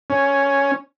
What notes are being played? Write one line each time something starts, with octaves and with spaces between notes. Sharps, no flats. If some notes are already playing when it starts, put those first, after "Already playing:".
C#4